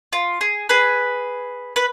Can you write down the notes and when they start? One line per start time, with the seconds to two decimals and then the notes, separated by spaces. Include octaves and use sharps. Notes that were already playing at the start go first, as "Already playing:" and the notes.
0.13 F4
0.41 G#4
0.69 G#4 B4
1.76 B4